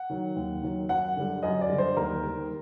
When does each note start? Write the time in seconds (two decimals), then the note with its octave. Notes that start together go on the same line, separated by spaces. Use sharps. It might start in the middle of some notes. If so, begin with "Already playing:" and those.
Already playing: F#5
0.10 D#3 F#3
0.36 D#2
0.63 D#3 F#3
0.89 F#2 F#5
1.16 D3 G3
1.43 F#2 D#5
1.61 D5
1.69 D3 G3
1.78 C5
1.97 D#2 A#4
2.23 D#3 G3